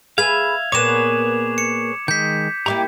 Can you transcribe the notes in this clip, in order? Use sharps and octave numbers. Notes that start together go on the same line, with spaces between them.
G#4 B4 E5 F5 G#6 F7
A#2 A#3 B3 G#4 B4 C#5 D6 E7
C#7
D#3 G#3 G6 B6
A#3 E4 G4 A#5 C#6 D6